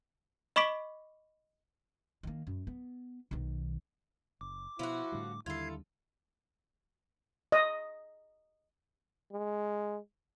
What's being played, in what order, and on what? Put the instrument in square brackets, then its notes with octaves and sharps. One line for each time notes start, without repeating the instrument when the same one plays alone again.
[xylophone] D#5 B5 C#6 D6 B6 D7
[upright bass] D#3 A#3
F#2
B3
B1 D#3
[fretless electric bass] F#1 [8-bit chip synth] D6
[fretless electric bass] B2 [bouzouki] F3 F#4 [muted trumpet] E4
[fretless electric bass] A2 D3 G3
[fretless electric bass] D#2 D3 G3 [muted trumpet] E4 [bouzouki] F4 A4 [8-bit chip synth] G#6 C7
[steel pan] D#5
[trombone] G#3